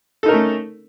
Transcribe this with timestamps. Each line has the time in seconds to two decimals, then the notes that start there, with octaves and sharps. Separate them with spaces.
0.23 A4
0.26 D#4
0.28 A#4
0.31 C#4
0.34 A3